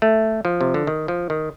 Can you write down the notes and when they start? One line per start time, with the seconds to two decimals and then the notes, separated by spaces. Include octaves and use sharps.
0.02 A3
0.45 F3
0.61 C3
0.74 D3
0.87 D#3
1.08 F3
1.30 D#3